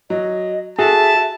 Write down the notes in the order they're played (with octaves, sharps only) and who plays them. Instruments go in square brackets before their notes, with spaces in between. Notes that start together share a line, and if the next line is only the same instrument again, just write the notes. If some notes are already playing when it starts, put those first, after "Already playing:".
[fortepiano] F#3 [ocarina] D#5
[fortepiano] F#4 A4 [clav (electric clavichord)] G#4 [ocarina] E5 [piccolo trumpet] A5